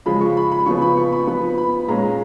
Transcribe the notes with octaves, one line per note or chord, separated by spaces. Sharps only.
C#3 F3 G#3 B5
C#6
B5
B5
C#3 F3 B3 C#6
B5
C#6
B5
F3 B3 B5
B5
A#2 G#3 C#4 A#5
A#5